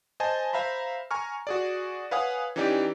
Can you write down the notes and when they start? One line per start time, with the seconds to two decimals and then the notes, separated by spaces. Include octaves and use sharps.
0.20 C5 D#5 G#5 A5
0.53 C5 E5 F5 A#5 B5
1.11 G#5 A#5 C#6 F6
1.47 F#4 G#4 D5
2.11 B4 C#5 F5 F#5 G#5 D#6
2.56 E3 C#4 D#4 G4 D5